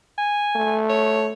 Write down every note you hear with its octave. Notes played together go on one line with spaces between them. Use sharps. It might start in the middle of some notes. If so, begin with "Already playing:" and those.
G#5
A3
C#5